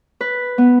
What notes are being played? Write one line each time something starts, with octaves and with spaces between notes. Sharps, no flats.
B4
B3